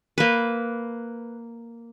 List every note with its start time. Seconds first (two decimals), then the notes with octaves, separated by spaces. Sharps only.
0.18 A#3 B4